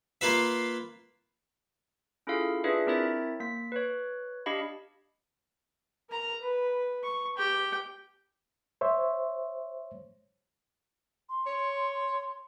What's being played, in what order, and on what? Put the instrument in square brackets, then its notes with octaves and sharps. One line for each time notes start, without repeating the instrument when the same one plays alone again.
[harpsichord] A#3 F4 B4 E5
[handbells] C#4 E4 F4 G#4 A4 F5
D4 F4 G#4 B4 E5
C4 E4 A#4 C#5 E5 A6
A#3 B6
B4 C#5
D4 G4 D#5 F5 B5
[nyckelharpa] A#4 A#5
B4
C#6
G4 G5
[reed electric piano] C5 C#5 E5
[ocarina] C6
[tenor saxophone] C#5